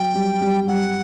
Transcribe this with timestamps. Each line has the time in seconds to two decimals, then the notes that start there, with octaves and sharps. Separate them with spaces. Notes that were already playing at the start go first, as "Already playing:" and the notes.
Already playing: F#3 G5
0.14 G3
0.41 G3
0.67 G3 F#5